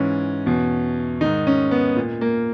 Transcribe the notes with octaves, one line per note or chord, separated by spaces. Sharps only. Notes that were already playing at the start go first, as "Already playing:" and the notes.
Already playing: G#2 E3 C#4
E2 B2
G#2 D#3 D#4
C#4
B3
A#2
A#3